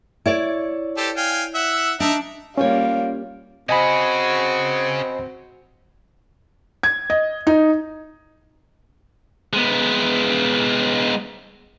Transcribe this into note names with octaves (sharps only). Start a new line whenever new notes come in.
E4 C#5 D5
G4 A4 C5
F5 G5 G#5
E5 F#5 E6
D4 D#4 E5
G3 A#3 C#4 F4 G4 C#5 F5
C4 C#4 F#4 G#4 D#5 G#5 B5
G#6
D#5
D#4
G#3 B3